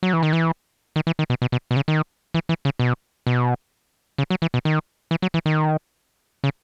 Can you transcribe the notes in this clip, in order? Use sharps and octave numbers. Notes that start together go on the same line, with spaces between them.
F#3
E3
D#3
E3
D#3
E3
D#3
B2
B2
B2
B2
C#3
D#3
E3
E3
C#3
B2
B2
C#3
F#3
E3
B2
D#3
E3
F#3
E3
D#3
C#3